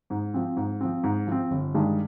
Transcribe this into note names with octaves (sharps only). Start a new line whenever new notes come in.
G#2
F3 C4
G#2
F3 C4
G#2
F3 C4
G1
G2 D#3 G#3